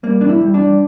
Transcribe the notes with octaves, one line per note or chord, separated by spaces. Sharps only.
G3 A#3
E2 D4
E4
G3
D4
G3